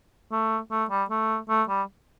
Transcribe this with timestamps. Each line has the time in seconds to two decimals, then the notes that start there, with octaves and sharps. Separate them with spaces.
0.32 A3
0.71 A3
0.90 G3
1.10 A3
1.49 A3
1.69 G3